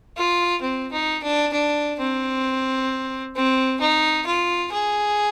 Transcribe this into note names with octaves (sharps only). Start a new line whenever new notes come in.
F4
C4
D#4
D4
D4
C4
C4
D#4
F4
G#4